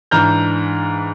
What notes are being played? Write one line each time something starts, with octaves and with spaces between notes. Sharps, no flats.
G#2 E3 D4 A#5 F6 G6